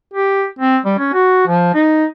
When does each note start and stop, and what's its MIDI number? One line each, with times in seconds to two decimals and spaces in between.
0.14 0.46 67
0.59 0.78 60
0.85 0.95 55
0.98 1.12 61
1.13 1.45 66
1.47 1.70 53
1.74 2.05 63